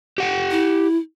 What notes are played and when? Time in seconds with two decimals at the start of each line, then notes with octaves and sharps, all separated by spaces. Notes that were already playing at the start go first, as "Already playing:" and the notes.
0.18 G4 F#5 G5
0.51 E4